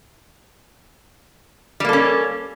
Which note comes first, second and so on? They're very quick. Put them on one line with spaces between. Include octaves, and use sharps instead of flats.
G3 A#3 A4 C#4